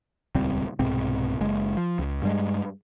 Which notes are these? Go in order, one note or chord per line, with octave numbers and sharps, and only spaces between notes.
D#1 C#2 G3 C4
C2 G#2 B2 C4
F#1 G#3
F3
C#2
G2 G3 G#3